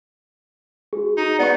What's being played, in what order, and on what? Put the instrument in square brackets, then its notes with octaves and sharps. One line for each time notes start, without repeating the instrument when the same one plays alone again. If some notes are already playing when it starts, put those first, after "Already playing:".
[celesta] F#4 G#4
[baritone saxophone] D#4
[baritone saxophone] B3 [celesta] D5 F#5 C#6